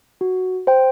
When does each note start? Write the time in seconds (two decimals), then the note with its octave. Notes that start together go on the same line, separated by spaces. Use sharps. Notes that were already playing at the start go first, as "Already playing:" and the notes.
0.21 F#4
0.67 C5 G5